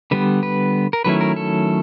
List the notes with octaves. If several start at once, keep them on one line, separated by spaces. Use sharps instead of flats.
D3 G3 B3 B4
B4
A#4
D#3 F#3 A3 C#4 E4 B4
A#4
A4